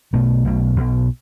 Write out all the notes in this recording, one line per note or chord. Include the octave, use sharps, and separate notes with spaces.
B1 B2 A3
B1 B2
B1 B2